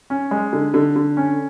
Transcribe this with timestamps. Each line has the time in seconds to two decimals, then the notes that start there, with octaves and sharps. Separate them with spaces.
0.10 C#4
0.31 G#3
0.53 D3
0.74 D3
0.96 D3
1.17 C#4